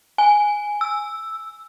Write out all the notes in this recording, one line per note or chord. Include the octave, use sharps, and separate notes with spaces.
G#5
E6